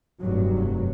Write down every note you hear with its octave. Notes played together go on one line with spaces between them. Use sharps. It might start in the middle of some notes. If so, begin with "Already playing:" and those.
F1 G2 F#3